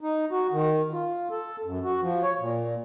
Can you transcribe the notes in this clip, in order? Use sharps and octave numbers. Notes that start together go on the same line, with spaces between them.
D#4
F#4
D#3
F4
A4
F#2
F#4
F3
C#5
A#2